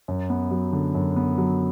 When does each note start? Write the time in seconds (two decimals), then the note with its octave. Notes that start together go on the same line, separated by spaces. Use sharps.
0.08 F#2
0.30 B3
0.51 F#3
0.73 D3
0.95 F#2
1.16 B3
1.38 F#3